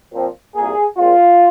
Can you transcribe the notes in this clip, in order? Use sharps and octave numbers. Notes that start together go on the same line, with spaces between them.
A#2 F3 C4
C2 A#2 A#3 G#4
A#2 G#3 C4 F4